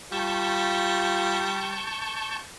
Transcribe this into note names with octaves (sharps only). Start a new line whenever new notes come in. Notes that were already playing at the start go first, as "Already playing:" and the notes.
G3 F4 A5 C#6 G6